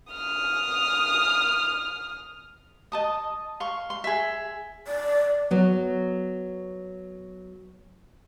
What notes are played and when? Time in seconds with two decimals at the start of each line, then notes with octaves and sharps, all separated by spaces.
0.13 D#6 F6
2.92 D#5 A5 D#6
3.60 F5 C6 C#6
3.90 C6
4.04 G#4 E5
4.87 D5
5.51 F#3 B3